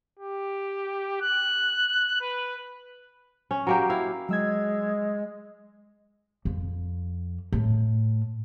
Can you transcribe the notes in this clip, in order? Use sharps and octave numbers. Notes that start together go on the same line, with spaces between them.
G4
F#6
B4
C#4
F#3 A#3 G4
E4 F5
F#3 G#3 E6 G#6
F2
A2